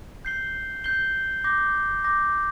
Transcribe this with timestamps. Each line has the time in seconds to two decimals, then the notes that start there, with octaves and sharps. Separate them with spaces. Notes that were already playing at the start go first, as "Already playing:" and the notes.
0.25 G6 C7 G7
0.84 G6 C7 G7
1.44 D6 G6 A#6
2.04 D6 G6 A#6